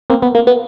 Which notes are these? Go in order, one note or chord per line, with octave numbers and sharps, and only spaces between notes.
A#3 C4
B3
A#3
B3